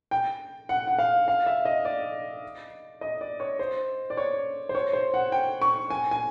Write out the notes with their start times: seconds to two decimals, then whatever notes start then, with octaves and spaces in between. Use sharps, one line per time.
0.11 G5
0.69 F#5
0.87 F#5
0.99 F5
1.28 F5
1.46 E5
1.65 D#5
1.85 D5
3.01 D#5
3.21 D5
3.40 C#5
3.59 C5
4.10 D5
4.17 C#5
4.69 C5
4.75 C#5
4.93 C5
5.14 F#5
5.32 G5
5.62 C#6
5.90 G#5
6.11 G#5